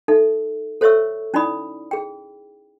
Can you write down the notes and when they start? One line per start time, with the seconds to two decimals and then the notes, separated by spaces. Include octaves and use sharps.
0.08 D#4 A4 E5
0.81 A4 C5 C#5 E5 C#6 E6
1.34 C#4 D#4 E4 D5 B5 D#6
1.91 G#4 G5